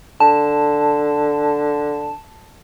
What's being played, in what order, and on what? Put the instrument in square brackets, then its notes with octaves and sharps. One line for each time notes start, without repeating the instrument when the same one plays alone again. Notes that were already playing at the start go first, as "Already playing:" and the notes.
[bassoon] D3 [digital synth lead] A5